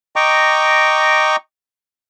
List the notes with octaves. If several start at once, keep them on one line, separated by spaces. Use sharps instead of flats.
D#5 G5 A#5 C#6 D6